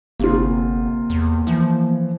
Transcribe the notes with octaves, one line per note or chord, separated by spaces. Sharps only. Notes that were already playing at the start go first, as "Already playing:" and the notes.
G1 C3 A#3 F4
E2
E3 F3